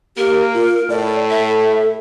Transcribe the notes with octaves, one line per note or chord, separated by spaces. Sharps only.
A#3 G4 A#4
F4
A2 D5
A4 E5